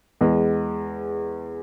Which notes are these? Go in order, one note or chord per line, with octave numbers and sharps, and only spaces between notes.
E2 G#3